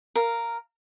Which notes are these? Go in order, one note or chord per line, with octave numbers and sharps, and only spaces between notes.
A#4 F5